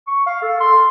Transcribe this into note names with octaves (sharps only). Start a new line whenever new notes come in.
C#6
F5
A4
C6